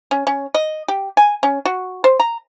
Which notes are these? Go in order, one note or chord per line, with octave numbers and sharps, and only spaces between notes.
C#4
C#4
D#5
G4
G#5
C#4
F#4
C5
A#5